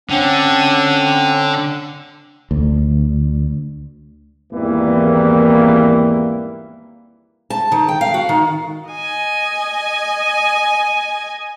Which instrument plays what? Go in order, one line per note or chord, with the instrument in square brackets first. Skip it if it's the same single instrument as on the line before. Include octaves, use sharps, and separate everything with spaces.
[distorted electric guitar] D3 [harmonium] C4 C#4 F#5
[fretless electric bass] D2
[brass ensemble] G#1 E2 E3 G3 A#3
[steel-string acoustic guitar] A5
D#3
G5
F5
F#4
D#3
[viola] D#5 G#5